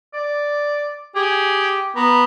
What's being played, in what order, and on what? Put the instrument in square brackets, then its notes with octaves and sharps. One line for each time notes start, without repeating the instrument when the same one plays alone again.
[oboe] D5
[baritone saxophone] G4 [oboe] G#4
[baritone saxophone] B3 [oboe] A#5